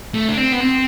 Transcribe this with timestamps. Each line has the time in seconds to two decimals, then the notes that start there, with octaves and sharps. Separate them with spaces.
0.14 A3
0.29 D4
0.37 C4
0.52 B3
0.60 C4